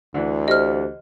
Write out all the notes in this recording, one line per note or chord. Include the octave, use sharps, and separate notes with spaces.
D2 D3 E3
G4 C5 D#5 F6